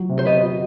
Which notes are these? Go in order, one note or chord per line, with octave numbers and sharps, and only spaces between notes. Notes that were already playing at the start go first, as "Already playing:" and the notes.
Already playing: F#3 F#4
C3
C5
B3 B4 D#5
F#4